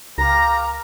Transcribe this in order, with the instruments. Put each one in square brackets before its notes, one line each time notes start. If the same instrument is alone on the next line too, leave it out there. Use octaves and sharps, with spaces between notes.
[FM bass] C#2 [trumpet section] G4 A#4 F5 [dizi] A#5 [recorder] A#6